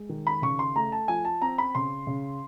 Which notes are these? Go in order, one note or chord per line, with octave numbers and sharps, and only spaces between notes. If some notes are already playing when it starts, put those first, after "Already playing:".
Already playing: G#3
D#3
B5
C#3 C#6
C6
A3 A#5
A5
F3 G#5
A5
C4 A#5
B5
C#3 C6
C#3